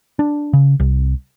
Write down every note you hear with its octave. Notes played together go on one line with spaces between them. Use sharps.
D4
C#3
C2